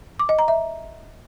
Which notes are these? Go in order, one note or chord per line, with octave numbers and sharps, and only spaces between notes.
D6
D#5
A#5
E5